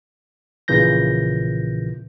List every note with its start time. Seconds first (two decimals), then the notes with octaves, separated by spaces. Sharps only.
0.68 A#1 A#2 C#3 E3 G6 A#6